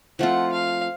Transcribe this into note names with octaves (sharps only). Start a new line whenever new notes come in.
F3 A3 C4 F4 F#5
F5